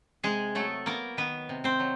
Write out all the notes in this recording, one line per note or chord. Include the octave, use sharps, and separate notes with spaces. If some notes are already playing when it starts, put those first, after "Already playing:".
C3 G#3 G#4
F#3 A3 A4
A#3 B3 A#4
D#3 B3 B4
C3
C4 C5
F#3